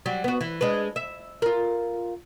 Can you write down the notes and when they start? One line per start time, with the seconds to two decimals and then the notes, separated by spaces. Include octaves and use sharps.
0.06 F#3 G3
0.24 B3 F#4
0.41 E3
0.61 G#3 D4 B4
0.96 E5
1.42 F4 A#4